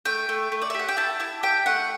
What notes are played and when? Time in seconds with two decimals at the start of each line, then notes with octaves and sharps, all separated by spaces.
0.05 A3 G5
0.29 A3
0.52 A3
0.62 D5
0.70 E5
0.75 G4 F#5
0.88 G5
0.97 E4 A5
1.20 E4 A5
1.43 G4 G5
1.66 A3 F#5